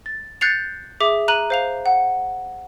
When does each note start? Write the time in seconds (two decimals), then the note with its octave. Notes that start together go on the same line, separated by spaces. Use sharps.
0.06 A6
0.41 F#6 G6 A6 C7 C#7 F7
1.00 G#4 E5 D6
1.28 A#5 F#6 D#7 F#7
1.50 C5 F5 F7
1.86 F#5